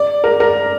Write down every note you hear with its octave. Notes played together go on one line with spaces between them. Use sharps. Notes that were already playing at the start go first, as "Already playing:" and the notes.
Already playing: D5
A#4
A#4